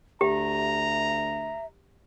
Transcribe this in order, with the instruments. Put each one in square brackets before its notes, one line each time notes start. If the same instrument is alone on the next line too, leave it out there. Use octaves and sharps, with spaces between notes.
[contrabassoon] D2 [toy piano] G4 [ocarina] E5 [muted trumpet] A#5